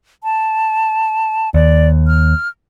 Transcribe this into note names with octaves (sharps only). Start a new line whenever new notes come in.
A5
D#2 D5
F6